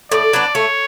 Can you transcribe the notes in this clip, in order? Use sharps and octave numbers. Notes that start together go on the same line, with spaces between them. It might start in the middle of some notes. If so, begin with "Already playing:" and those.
A2 D5
F#3 B3 D4
A3 C#5